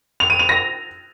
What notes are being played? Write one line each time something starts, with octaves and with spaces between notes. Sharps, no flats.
F7
D#7
F7
A#6